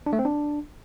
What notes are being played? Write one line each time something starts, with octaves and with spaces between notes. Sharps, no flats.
D4
A3
C4
D4